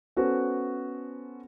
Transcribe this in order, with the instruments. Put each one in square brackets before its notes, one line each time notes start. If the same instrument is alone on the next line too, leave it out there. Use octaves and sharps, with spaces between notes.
[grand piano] B3 C#4 F#4 A4 C5